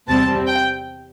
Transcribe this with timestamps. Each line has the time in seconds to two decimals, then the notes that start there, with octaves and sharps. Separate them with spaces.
0.08 E2 C3 G3 C4 A5
0.47 G5